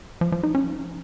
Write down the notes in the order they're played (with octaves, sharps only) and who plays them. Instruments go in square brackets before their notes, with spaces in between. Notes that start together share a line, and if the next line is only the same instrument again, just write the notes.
[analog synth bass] F3
F3
D#4
C#4